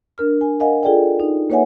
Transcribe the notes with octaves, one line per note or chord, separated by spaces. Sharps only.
D4 A#4 F6
G#5
A#4 D#5 F5 F#5 G#5
F4 G#4 A4 D5 G5
D#4
A#3 B4 C#5 E5 F#5 G#5